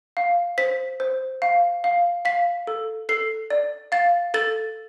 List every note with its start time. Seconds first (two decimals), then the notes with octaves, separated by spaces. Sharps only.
0.17 F5
0.58 C5 B6
1.00 C5
1.42 F5
1.84 F5
2.25 F5 B6
2.67 A4
3.09 A4 C7
3.50 D5
3.92 F5 A6
4.34 A4 A6